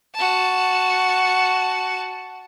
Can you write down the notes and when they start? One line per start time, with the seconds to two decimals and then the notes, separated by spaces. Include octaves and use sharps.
0.15 F#4 A5